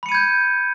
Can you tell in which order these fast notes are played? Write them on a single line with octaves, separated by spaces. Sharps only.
B5 C#7 D#7 G#6 G6